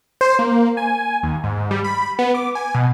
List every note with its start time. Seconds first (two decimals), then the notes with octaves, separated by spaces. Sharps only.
0.21 C5
0.39 A#3
0.77 G#5
1.23 D#2
1.44 G#2
1.71 G3
1.84 B5
2.19 B3
2.34 D6
2.55 G#5
2.75 B2